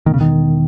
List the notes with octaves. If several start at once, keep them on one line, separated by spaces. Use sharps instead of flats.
E1 D#3
C#3
D#3